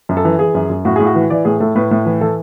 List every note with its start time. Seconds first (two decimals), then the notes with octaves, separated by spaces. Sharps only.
0.09 F#2
0.17 A4
0.25 E3
0.39 E3 G#4
0.54 F#2
0.70 F#2
0.85 A2 F#4
0.96 A2 G#4
1.06 F#4
1.15 E3
1.30 E3 D5
1.45 A2 G#4
1.60 A2 A4
1.76 A2 B4
1.91 A2
2.06 E3
2.21 E3 A4